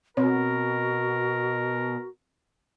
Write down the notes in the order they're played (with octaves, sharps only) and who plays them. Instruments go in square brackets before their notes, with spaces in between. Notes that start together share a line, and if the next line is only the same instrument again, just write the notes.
[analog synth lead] B2 [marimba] C4 C#5 [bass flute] F#4 [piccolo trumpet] A#4